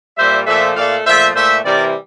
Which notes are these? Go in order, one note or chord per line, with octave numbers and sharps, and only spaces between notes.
A#2 G3 C5 E5
A#2 F3 A3 C5 E5
A#2 A3 D5 F5
A#2 F3 A3 C5 E5
A#2 A3 C5 E5
C3 E3 G3 A#4 D5